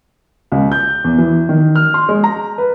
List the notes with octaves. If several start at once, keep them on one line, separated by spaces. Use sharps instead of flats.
C#2
G6
E2
E3
D#3
F6
C6
G#3
A#5
B4